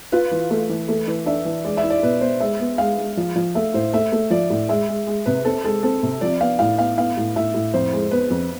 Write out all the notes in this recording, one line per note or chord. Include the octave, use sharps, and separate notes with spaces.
F4 B4
E3
A3
E3
A3
E3
D4 E5
E3
G#3 D5
E5
E4
D5
B2 B4
B3 C5
G#3 E5
B3
G#3 F5
G#3
F3
F3
A3 E5
A2 C5
A3 E5
A3
F3 D5
A2
G#3 E5
G#3
G#3
C3 B4
C4 A4
G#3 A4
C4 A4
C3
F3 D5
B3 F5
A2 F5
B3 F5
B3 F5
A2
A2 E5
A2
F2 C5
G#3
B3 B4
F2